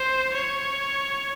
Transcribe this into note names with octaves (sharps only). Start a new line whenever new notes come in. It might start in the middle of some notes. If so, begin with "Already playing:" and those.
Already playing: C5
C#5